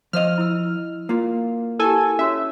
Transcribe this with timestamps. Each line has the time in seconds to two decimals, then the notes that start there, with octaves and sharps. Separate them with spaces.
0.13 F3 C5 D#5 F6
0.38 E4 E6
1.09 A#3 F4
1.79 E4 G4 A4 G#5
2.19 C#4 F#4 C#5 E5